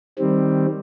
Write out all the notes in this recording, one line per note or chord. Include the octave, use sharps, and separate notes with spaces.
D#3 G3 C4